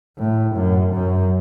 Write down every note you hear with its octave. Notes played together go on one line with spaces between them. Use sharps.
A2
F#2
F#2